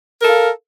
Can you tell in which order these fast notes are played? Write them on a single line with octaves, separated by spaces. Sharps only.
A#4 A4 F5